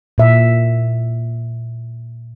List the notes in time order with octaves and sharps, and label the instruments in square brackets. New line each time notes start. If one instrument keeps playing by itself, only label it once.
[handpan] A#2 E5